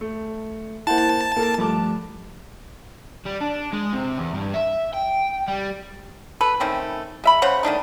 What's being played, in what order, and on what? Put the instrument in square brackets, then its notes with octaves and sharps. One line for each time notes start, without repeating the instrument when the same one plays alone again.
[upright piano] A3
[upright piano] A#3 C5 F#5 [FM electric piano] E4 [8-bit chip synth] A5
[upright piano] A#3 A4 A#4
[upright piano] G2 A5 D6 [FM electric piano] F3 A3
[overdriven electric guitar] G3
D4
G#3
C3
E2
G2
E5
G5
G3
[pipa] A4 B4
D#3 A3 C4 C#4
G#3 E5 B5
C#3 C5 C#5 F#5
D#3 A3 D4 D#4